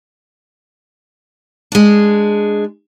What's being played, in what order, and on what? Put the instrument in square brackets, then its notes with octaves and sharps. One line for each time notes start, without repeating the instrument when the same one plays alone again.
[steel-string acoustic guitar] G#3 D4